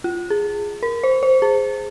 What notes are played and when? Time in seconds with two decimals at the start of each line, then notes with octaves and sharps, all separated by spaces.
0.04 F4
0.30 G#4
0.83 A#4
1.03 C5
1.23 C5
1.42 G#4